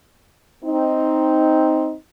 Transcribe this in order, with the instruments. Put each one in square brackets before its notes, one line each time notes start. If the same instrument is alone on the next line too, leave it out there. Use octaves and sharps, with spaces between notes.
[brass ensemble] C4 D#4